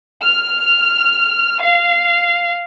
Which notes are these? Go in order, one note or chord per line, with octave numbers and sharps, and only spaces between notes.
F6
F5